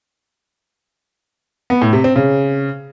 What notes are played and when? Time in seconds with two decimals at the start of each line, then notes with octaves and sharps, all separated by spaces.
1.70 B3
1.81 A2
1.93 C3
2.04 C4
2.16 C#3